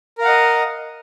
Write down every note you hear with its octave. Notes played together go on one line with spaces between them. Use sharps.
A#4 D#5 F5 F#5